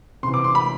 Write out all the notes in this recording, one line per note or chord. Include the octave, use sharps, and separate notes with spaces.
C3 E3 C6
D6
C6
B5